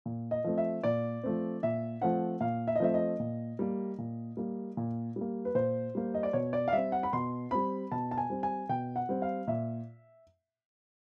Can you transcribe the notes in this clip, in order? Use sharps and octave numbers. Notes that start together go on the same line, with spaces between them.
A#2
D#5
F3 A3 C4
E5
A#2 D5
F3 A3 C4
A#2 E5
F3 A3 C4 F#5
A#2 F5
E5
D#5
F3 A3 C4 E5
D#5
A#2
G3 A#3
A#2
G3 A#3
A#2
G3
A#3
B4
A#2 C5
G3 A#3
D#5
D5
B2 C#5
D5
F5
G3 C4 E5
F#5
B5
B2 C6
G3 C4 B5
B2 A5
A5
G#5
G3 C4
G#5
B2 G5
F#5
G3 C4
F5
A#2 E5